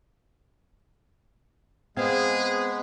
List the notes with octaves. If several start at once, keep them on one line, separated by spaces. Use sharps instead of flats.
G#3 B3 C4 G#4 F5